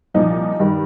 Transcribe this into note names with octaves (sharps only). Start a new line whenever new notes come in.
C2 A#2 F3 D#4
G2 D#3